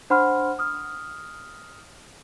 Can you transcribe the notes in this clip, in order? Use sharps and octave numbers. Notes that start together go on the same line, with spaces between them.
D4 C5 F#5 B5 C6 F6
D#6 F6